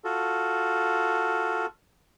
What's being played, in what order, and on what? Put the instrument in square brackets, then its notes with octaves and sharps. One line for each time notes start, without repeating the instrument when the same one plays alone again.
[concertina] F4 F#4 A4